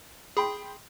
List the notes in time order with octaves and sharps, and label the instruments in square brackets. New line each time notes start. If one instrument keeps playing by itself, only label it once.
[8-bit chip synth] G#4 [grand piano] G5 B5 C6